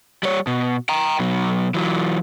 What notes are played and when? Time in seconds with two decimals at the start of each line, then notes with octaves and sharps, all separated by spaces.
0.23 G3 C#5
0.47 B2
0.89 G5 A#5
1.19 B2 F#3
1.74 E3 F#3